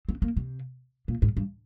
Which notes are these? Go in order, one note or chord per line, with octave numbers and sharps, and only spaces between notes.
C4
A#3
C3
A#2
G#2
G2